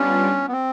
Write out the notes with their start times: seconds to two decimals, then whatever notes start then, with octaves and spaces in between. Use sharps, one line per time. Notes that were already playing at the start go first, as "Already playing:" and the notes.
Already playing: G3 B3 C#4 D4 F4
0.48 B3
0.52 C4